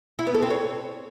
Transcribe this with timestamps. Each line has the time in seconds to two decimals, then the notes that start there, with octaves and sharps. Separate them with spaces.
0.19 E4
0.27 B3
0.35 A4
0.42 C4
0.50 C#5